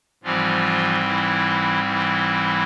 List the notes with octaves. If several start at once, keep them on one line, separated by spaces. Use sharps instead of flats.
G#2 E3 F3 G3 C4 F4
E3 E4
E3 E4